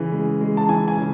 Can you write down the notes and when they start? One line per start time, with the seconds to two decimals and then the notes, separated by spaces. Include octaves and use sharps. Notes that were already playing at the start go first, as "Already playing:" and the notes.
Already playing: C#3 E3
0.12 G#3
0.41 G#3
0.57 A5
0.69 E3 G#5
0.88 G#5
0.98 C#3